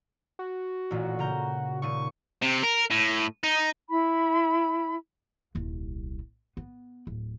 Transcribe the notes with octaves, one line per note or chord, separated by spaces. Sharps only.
F#4
A1 A#2
C#3 A#5 G6
D#1 A#2 C#6 D#7
C3
A#4
A2
D#4
E4 B5
D#1 C2
B3
D1